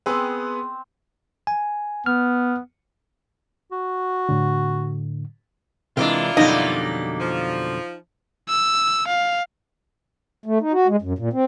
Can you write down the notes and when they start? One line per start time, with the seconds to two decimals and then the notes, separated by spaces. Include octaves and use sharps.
0.06 B3 C4 G#4 B4
1.47 G#5
2.06 B3 F6
3.71 F#4
4.29 A2 D3
5.97 C3 E3 G#3 D4 E4 F4 A#4
6.37 F2 B2 D3 F#3 G3 A#3 D#4 D#5
7.20 F3
8.49 E6
9.07 F5
10.46 A3
10.61 D#4
10.72 F#4
10.87 G#3
11.02 F#2
11.19 A#2
11.33 C4